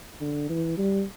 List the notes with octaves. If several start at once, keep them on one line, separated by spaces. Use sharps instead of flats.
D3
E3
G3